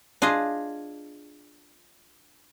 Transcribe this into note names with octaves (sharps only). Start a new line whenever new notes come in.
D4 F4 G#4 D#5